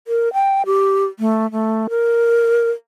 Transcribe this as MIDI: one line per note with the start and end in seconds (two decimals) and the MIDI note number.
0.07 0.32 70
0.33 0.63 79
0.66 1.05 67
1.19 1.50 57
1.52 1.87 57
1.90 2.70 70